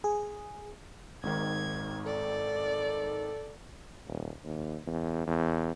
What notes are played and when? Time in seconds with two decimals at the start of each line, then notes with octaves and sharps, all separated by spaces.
0.04 G#4
1.23 G#1 G#2 D#3 G#6
2.06 A4 D5
4.08 D#1
4.44 D#2
4.87 E2
5.27 E2